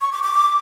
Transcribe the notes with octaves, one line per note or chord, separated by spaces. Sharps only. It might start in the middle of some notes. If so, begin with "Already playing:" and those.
C#6
D6
D6